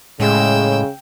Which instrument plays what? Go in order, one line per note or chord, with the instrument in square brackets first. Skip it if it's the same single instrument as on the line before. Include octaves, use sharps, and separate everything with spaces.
[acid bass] A2 [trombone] C#3 [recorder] G#3 [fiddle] G5 E6